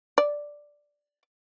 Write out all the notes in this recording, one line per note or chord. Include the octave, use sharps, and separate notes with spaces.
D5